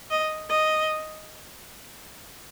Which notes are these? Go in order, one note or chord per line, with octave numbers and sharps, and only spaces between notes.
D#5
D#5